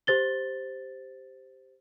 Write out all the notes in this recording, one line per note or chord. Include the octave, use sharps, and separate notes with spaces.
G4 C5 A6 G7